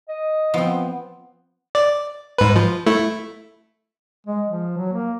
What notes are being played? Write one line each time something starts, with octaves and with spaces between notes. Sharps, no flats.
D#5
F3 B3 C4
D5
G#2 B4
F3
A3 E4
G#3
F3
F#3
A#3